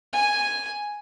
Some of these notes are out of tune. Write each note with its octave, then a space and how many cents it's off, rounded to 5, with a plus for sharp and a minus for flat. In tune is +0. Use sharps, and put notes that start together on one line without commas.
G#5 -5